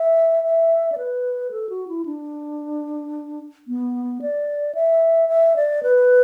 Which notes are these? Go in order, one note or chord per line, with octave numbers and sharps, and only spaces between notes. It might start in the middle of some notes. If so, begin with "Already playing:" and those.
Already playing: E5
E5
D5
B4
A4
F#4
E4
D4
B3
D5
E5
E5
D5
B4